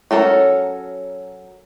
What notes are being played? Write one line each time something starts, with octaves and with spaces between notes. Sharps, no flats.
F#3 C#4 A4 A#4